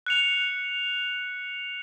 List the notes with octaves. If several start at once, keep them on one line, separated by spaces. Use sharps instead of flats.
F#6 C#7 F7